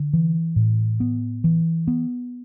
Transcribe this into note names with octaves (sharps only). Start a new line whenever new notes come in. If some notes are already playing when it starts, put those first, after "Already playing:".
Already playing: D3
E3
A2
B3
E3
B3